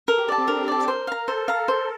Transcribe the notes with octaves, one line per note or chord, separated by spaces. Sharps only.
A4 A#4
G4
A4 D5 A5
C4
D4 A#4
G4
A4 D5 A5
A#4 C5
F5 A#5
A4 C5
F5 A#5
C5